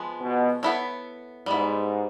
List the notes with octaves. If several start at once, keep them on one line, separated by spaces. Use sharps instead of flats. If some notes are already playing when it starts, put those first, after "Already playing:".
Already playing: F3 G#3 B3
B2
B3 E4 A4 C#5
G#2 G3 B3 E4